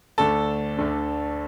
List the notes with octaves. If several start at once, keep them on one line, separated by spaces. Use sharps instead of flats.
D2 D3 A3 D4 A4 A5
D2 D3 A3 D4